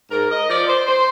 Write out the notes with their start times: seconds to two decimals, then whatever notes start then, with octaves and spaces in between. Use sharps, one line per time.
0.10 G#2 A#4
0.30 D#5
0.48 F3 D5
0.67 C5
0.86 C5